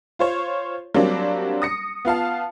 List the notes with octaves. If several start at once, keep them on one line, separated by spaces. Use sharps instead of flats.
F4 C5 C#5
F#3 G3 A#3 C4 D4
D#6 A#6 C#7
B3 F4 F5 A5